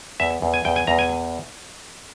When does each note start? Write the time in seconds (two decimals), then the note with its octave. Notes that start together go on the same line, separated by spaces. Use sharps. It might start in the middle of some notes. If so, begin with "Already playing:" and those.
0.20 E2 E5
0.42 E2
0.54 G#5
0.65 E2 G5
0.76 G#5
0.87 E2 A#5
0.99 G#5